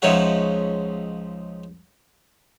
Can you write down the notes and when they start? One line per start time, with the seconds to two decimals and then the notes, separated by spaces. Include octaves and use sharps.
0.02 C#2 F3 D#4 C#5 E5 F#5